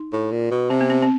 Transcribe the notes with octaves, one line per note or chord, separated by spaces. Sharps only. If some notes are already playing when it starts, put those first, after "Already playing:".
Already playing: D#4
A2
A#2
B2
C3 C4
B3
C4
C4